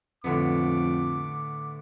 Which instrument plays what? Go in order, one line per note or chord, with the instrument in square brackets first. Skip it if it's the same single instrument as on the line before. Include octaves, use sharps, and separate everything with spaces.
[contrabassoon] F2 [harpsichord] A2 D3 B3 [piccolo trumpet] D6